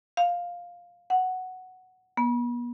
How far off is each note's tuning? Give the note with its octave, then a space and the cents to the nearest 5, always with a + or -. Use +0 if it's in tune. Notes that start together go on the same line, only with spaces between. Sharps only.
F5 +10
F#5 +5
B3 -40